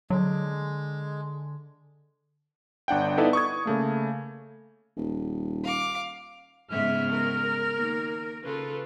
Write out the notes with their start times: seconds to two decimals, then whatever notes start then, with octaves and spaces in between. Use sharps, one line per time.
0.10 D3 F#3 G#3
2.88 G1 D4 F#5 G5
3.17 B3 D#4 E4 A4 B4 D5
3.33 C#6 D#6 G#6
3.65 C#3 A3 A#3
4.97 D#1
5.64 F5 D6
6.71 G#2 C#3 G#3 B3 E5 F6
7.10 A#4
7.73 D#3 A#3
8.44 C#3 F4 A4 B4